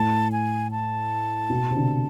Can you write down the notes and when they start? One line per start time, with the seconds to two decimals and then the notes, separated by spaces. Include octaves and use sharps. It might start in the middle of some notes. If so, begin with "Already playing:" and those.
Already playing: A2 A5
0.32 G#5
0.71 A5
1.50 B2
1.71 C3
1.76 D3